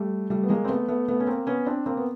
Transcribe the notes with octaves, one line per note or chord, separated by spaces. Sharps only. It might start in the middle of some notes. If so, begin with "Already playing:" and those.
Already playing: G3 A3
G3 A3
B3
G#3 A#3
C4
A3 B3
A3 B3
A3 B3
C#4
A#3 C4
B3 C#4
C4 D4
A#3 C4
B3